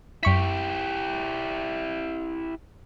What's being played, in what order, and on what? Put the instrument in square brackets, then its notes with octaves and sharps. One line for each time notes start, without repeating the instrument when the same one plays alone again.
[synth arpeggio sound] F#2 C#6 B6 [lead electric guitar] E4 G4